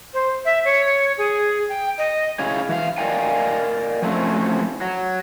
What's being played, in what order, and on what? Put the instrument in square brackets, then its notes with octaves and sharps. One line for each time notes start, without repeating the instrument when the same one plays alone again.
[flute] C5
E5
C#5
G#4
G5
D#5
[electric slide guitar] C#4 E4 G#4 F5
E3 F5
A#4 D5 D#5 F5 G5 G#5
F3 F#3 A3 C4 C#4 E4
F#3